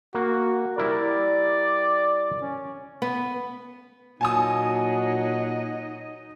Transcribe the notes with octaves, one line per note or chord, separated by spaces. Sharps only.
A#3 F#4
G3 E4 A#4 D5
C#4
B3
A#2 F#3 D#4 D#5 G#5 A5 D#6